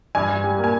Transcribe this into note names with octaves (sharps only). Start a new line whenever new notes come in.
G2 G#5
G2
G3
A#3
G#5